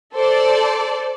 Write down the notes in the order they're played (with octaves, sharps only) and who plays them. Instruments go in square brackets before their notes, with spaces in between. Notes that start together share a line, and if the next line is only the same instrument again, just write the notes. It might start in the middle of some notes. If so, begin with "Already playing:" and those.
[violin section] A4 C5 D5